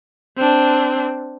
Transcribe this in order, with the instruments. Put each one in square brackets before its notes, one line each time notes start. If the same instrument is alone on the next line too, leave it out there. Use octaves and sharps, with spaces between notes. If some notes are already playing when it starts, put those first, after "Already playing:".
[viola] C4 D4